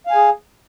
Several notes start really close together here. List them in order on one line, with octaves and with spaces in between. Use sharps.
F5 G#5 G#4